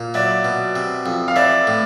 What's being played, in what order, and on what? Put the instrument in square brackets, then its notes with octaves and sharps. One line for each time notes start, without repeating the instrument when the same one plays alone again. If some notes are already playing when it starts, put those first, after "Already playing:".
Already playing: [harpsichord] A#2
[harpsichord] F#3 [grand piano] D5 E5
[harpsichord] B2
C3
F2
[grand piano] F5
[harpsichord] E3 [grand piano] D5 E5
[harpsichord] A2